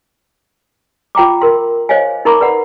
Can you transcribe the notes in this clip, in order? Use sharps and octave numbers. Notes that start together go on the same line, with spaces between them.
F4 G5 A#5 D6
A#4 C6
C5 C#5 D#5 F5 G#5
D#4 A#4 A#5 B5 C#6 D6
B4 D5 F#5 B5